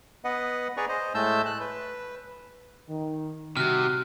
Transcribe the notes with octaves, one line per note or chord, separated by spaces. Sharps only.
B3 B4 D#5 F#5
G#4 B4 D5 G#5 A#5 C#6
C5 D#5
A2 G#3 A3 A5 E6 G6
F#6
B4
D#3
C3 D#3 G3 F#4 F6 F#6